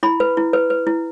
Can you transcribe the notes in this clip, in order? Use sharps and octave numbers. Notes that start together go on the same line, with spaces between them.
E4 B5
B4
E4
B4
B4
E4